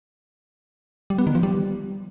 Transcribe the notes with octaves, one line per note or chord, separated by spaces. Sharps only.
G3
B3
D#3
F3
G3